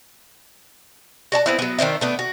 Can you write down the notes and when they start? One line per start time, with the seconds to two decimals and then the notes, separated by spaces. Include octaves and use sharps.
1.32 F#4 D5 A5
1.46 B3 C4 E4
1.59 F#3 B3
1.79 D#3 D4 C5 E5
2.01 A3 B3 D4
2.19 F#4